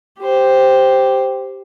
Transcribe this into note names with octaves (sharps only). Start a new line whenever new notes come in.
G4 C5